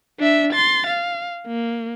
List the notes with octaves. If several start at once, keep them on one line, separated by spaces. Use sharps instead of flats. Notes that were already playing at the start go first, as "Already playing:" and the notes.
D4 E5
C6 A6
F5
A#3